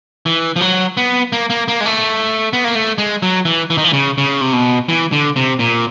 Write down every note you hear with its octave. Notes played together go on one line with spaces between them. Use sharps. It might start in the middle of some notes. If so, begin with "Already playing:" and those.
E3
F3
F#3
B3
A#3
A#3
A#3
G#3
A3
B3
A#3
A3
G#3
F#3
E3
E3
D#3
E3
C#3
C#3
C3
B2
E3
D3
C3
A#2